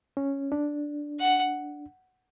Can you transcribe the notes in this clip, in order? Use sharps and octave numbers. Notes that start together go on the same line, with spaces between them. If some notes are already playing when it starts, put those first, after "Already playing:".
C#4
D4
F#5